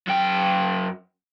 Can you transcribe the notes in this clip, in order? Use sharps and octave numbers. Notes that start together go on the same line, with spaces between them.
F#2 G5